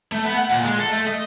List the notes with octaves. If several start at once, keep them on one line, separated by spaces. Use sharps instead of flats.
A3
B3
F#5
A#2
G#3
A4
A3
D#5